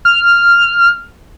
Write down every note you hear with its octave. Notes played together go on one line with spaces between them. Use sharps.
F6